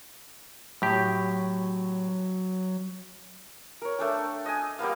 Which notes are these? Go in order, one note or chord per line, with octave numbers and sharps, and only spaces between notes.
A2 F#3 G4
A#4 C#5
A3 D4 G5
D#5 G#5
G3 A#3 B3 F5